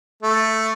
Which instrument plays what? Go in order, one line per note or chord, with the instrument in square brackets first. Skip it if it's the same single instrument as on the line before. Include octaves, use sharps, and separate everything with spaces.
[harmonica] A3